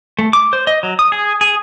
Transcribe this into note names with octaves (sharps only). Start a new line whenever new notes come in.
A3
D6
C5
D#5
F#3
D#6
G#4
G#4